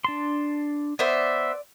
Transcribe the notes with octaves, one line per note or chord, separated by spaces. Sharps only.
D4 A5 C6
B3 C5 D5 E5